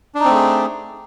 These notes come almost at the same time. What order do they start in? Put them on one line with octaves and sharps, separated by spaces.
D4 D#4 C4 A3 G#4